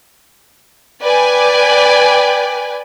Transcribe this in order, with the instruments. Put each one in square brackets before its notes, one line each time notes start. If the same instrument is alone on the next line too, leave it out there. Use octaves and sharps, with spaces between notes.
[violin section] B4 D5 G5 G#5